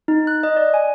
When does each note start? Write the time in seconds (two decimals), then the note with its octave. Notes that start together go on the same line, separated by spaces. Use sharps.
0.08 D#4
0.27 F#6
0.43 D#5
0.57 D5
0.74 G#5